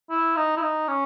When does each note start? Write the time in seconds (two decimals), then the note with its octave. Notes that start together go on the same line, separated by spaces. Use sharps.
0.10 E4
0.37 D#4
0.57 E4
0.62 D#4
0.88 C#4